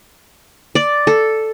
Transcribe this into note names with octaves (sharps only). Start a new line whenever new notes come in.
D5
A4